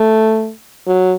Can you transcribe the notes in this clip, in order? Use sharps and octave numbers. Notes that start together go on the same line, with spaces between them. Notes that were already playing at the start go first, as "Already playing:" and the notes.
Already playing: A3
F#3